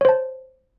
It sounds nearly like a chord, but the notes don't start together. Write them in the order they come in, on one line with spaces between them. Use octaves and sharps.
C#5 C5 A5